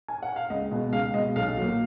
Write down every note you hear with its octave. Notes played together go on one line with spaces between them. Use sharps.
G#5
F#5
F5
C#2 D#5
B2 G#3
C#2 F5
B2 G#3 D#5
B1 F5
A#2 F#3